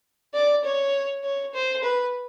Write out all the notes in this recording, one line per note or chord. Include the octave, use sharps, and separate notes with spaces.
D5
C#5
C#5
C5
B4